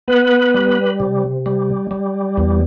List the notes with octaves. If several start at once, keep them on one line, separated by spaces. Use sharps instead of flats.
B3 B4
G3
C3
G3
G3
E2